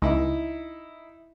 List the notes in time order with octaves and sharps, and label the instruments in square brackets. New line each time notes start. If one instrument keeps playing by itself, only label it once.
[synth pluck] C#2 [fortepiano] D#4 E4